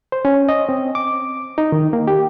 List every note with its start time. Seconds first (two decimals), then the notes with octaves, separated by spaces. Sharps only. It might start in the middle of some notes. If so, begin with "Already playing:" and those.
0.12 C5
0.25 C#4
0.49 D#5
0.69 C4
0.95 D6
1.58 D#4
1.72 D#3
1.93 A#3
2.08 G4